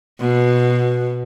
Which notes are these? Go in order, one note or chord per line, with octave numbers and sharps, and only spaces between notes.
B2